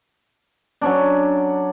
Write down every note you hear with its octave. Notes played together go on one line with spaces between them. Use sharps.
F#3 C#4 D4